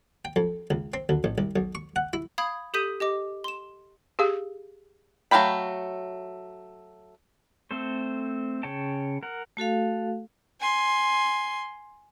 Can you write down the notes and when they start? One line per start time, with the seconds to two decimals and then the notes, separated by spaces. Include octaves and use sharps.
0.25 G5
0.36 F2
0.70 C#2
0.94 C4
1.09 D2
1.24 A1
1.38 C2
1.56 B1
1.75 C#6
1.96 F#5
2.13 E4
2.38 F5 B5 D#6 G#6
2.74 G4 A4 D#6 G6 B6 D#7
3.00 G4 D#5 D6
3.44 C6 E7
4.19 G4 G#4 F5
5.31 F#3 A3 F5 G5 B5
7.71 A3 C4 A4 C5
8.63 C#3 C#5 G5 A5
9.23 A#4 F#5
9.57 A3 F#4 A4 F5
10.60 G#5 C6